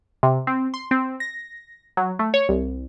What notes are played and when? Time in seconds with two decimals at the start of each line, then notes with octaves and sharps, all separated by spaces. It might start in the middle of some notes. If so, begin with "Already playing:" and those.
0.23 C3
0.47 C4
0.74 C6
0.91 C4
1.20 A#6
1.97 F#3
2.19 A3
2.34 C#5
2.49 C2